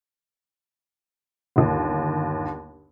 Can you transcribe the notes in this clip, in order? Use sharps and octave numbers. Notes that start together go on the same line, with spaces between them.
G1 D#2